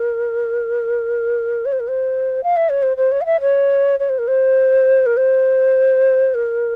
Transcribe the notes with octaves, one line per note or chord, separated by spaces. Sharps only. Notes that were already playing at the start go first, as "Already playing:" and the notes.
Already playing: A#4
C#5
C5
A#4
C5
F5
E5
C#5
C5
C5
C#5
F5
E5
C#5
C#5
C5
A#4
C5
A#4
C5
A#4